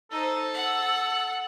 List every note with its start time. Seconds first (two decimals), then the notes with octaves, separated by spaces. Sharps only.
0.11 D#4 A4 C5
0.54 F#5